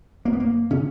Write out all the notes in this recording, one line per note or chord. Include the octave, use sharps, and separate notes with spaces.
F#2 A#3
B3
A#3
C#3 C#4